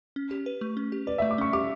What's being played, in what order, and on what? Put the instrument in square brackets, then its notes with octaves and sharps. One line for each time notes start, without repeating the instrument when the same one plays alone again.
[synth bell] C#4
G4
B4
A3
C#4
G4
[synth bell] B4 [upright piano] D5
[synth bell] A3 [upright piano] E5
[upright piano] D6
[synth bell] C#4 [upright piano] C#6
[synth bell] G4 [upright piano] D6